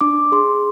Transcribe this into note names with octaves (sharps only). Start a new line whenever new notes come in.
D4 D6
G#4 C6